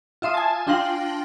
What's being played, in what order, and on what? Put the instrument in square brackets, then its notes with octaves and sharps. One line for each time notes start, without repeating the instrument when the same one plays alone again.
[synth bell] F4 E5 C6 D#6
G#5 A5
D4 F4 G5 C6 A#6 F#7